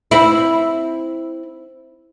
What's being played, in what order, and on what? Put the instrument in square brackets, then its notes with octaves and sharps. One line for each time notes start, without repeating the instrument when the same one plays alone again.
[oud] C4 E4